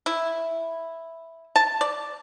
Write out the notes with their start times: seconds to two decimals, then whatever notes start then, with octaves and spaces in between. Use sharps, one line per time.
0.06 E4
1.56 A5
1.81 D5